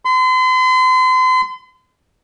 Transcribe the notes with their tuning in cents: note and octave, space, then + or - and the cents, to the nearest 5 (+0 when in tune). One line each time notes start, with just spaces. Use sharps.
C6 -40